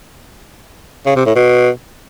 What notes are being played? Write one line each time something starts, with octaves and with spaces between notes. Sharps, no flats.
C#3
C3
A2
B2